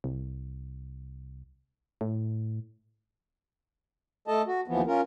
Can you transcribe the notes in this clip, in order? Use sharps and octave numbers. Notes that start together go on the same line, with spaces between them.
C2
A2
A3 A4 D#5 A5
F#4
D#2 E3 F3 B3
C#4 F4 A#4